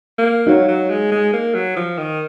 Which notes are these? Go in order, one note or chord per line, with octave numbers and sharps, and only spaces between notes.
A#3
F#3 D#4 F#4 C#5 F5
F#3
G#3
G#3
A#3
F#3
F3
D#3